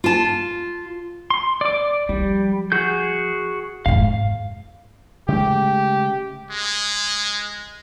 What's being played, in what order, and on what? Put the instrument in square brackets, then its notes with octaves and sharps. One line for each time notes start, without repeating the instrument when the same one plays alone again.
[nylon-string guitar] F4 A5
[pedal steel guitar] C6
D5 D6
[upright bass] F3 [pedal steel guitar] G3
[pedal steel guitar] F#4 G#4 G6
[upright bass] F2 G#2 [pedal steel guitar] F5
[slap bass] C#3 G#3 A3 [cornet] G4
[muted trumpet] G#3